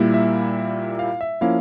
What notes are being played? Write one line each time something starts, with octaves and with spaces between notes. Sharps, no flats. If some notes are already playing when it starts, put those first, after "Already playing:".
Already playing: A#2 G3 A#3 E4
E5
F5
E5
F3 A#3 C#4 E4 F5